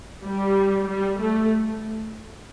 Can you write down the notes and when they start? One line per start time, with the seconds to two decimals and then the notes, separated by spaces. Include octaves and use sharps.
0.24 G3
0.87 G3
1.18 A3